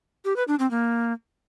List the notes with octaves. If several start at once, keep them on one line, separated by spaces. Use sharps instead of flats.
G4
B4
D4
C4
A#3